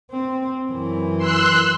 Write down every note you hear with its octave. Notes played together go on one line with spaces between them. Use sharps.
C4
F#2 E3
C6 E6 F#6